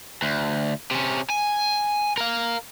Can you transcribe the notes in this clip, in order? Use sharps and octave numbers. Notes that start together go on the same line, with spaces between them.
D2
C3 C#4
G#5
A#4 F5